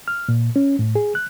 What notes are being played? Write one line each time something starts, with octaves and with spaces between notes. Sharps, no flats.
F6
A#2
C#4
A2
G#4
F#6